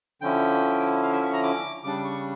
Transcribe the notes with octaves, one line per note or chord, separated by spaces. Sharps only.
D3 F3 C#4 E4 G5
F5
E5
C#6
A#5
D6
C#3 G3 D4 D6
C#6